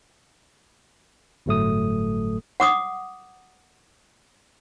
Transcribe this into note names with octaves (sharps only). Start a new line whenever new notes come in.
G1 A2 F#3 A3 A4 D#6
F#5 D6 D#6